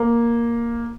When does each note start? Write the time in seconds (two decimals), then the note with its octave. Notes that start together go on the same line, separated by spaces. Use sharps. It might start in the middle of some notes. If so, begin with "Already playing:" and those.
Already playing: A#3